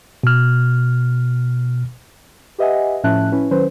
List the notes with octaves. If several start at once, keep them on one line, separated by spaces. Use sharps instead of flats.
B2 F6
G4 B4 D#5 E5 F#5 G#5
A2 F3 C#4 E5 A5 F#6
C#4 E4 B4
D#3 F#3 C#4 B4 C5